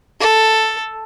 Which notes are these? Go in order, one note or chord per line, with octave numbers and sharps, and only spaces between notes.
A4